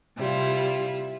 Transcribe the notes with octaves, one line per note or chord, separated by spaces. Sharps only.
C3 G3 E4 F4